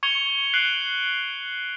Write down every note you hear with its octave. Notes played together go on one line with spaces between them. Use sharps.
C#6 G#6 C#7 F7 G7
F#6 C7 D7 F#7